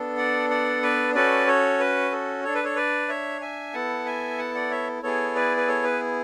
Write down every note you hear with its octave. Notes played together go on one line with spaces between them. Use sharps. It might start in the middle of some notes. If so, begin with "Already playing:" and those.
Already playing: B3 D4 A4
D5 F#5
D5 F#5
B4 D5
C#4 F#4 A4 B4 D5
A4 C#5
B4
A4
D4 A4 C#5
B4
A4 C#5
B4 D5
C#5 E5
E5 G#5
B3 E4 A4 F#5 A5
E5 G#5
F#5 A5
D5 F#5
C#5 E5
B3 E4 G#4 A4 C#5
B4 D5
B4
A4 C#5
B4